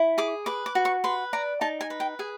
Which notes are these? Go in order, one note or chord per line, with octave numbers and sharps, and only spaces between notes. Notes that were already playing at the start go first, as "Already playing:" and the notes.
Already playing: E4
G#4 D6
B4 D6
D6
F#4
C#6
B4 C6
D5 A#5
D#4 A5
G#5
B4
G5
G#4 G#5